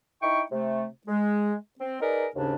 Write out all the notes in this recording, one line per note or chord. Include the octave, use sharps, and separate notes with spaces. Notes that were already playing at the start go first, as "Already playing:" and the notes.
D#4 E4 G5 C#6
C3 A3
G#3
C4
D#4 G#4 A#4 B4 D5
D#2 G#2 C#3 C#4 D4